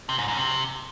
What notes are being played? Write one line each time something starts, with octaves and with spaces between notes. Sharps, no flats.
C3
G#2
F#2
C3